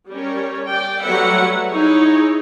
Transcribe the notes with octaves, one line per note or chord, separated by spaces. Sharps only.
G3 C#4 A#4 C#5
D5 G5
F#3 G3 A3 B4 E5 F#5
D#4 E4 G#4 C#5